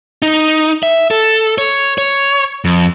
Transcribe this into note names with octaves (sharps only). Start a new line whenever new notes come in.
D#4
E5
A4
C#5
C#5
F2